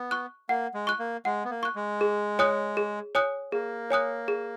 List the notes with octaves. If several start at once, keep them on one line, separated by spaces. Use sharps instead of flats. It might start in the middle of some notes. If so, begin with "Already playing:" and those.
Already playing: B3
C#6 F#6
A#3 F#5
G#3
C#6 F#6
A#3
G#3 F#5
B3
A#3
C#6 F#6
G#3
G#4
C#5 G#5 D#6 F#6
G#4
C#5 G#5 D#6 F#6
A#3 G#4
C#5 G#5 D#6 F#6
G#4